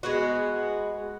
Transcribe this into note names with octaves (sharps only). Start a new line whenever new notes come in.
G#3 B3 F#4